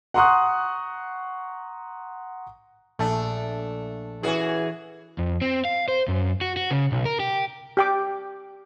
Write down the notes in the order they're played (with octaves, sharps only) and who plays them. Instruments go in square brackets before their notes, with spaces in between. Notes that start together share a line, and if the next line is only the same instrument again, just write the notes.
[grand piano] F#5 A#5 C6 C#6 D#6 F#6
[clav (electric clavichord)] A#1 A4 [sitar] A3 D4
[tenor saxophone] E3 [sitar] C#4 F#4 G#4
[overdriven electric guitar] F2
C4
F5
C5
F#2
F#4
F#4
C#3
B1
A#4
G4
[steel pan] G4 G5 D6